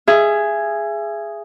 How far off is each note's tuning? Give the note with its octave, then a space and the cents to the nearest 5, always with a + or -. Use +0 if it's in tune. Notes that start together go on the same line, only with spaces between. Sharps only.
G#4 +0 E5 +30